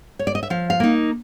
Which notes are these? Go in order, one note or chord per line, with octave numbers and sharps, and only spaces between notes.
C#5
D5
D#5
E5
F3 F5
F5
A#3 D#4